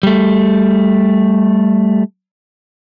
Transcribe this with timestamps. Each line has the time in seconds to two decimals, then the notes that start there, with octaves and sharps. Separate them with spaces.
0.03 G3 A3